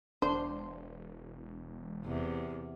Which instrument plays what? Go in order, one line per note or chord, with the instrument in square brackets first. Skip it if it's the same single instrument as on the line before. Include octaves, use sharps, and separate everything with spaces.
[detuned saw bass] E1 [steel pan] D4 C6 [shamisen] C5
[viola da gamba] E2 C3